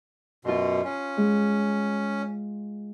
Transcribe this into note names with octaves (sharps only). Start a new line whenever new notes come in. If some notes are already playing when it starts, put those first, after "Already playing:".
F#2 B2 F4 C6
C#4
G#3